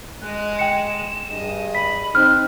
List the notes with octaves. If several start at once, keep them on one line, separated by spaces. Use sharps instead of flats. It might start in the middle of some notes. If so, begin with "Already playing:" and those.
G#3 D#5 F#6
G5 C#7 E7
G2 G#4 D#5
B5 B6
C4 D#4 F6 F#6